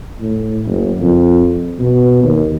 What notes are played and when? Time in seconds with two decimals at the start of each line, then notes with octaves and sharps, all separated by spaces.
0.21 A2
0.66 F#1
1.01 F2
1.79 B2
2.23 D#2